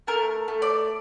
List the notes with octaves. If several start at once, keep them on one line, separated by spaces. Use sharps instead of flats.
A3 A#4
A3
D5